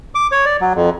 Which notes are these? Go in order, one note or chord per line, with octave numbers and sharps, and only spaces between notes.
D6
C#5
D5
F#3
F2